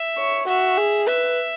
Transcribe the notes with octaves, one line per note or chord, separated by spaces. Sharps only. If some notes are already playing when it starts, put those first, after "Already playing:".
Already playing: E5
C#5
F#4 E5
G#4
B4 E5